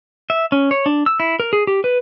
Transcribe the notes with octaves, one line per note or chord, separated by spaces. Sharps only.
E5
C#4
C#5
D4
E6
E4
A#4
G#4
G4
B4